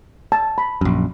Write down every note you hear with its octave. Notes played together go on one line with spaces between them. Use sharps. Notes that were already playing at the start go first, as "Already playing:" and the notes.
A5
B5
A#1 F#2